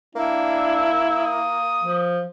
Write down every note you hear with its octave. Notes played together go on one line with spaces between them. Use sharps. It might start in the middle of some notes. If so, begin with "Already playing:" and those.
A#3 D4 E4
D#6
F3